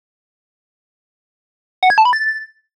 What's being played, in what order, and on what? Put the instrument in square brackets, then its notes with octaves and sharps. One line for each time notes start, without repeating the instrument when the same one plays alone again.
[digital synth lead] F#5
G#6
A5
B5
A6